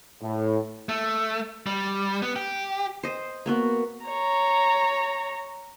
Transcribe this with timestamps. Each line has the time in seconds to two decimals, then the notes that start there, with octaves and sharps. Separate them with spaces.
0.22 A2
0.89 A3
1.66 G3
2.22 B3
2.36 G4
3.03 C5 D#5
3.46 A#3 B3 F#4
4.05 C#5 A#5